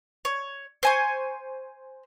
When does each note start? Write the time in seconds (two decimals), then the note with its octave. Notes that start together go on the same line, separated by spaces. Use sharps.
0.25 C#5
0.83 C5 G#5 C#6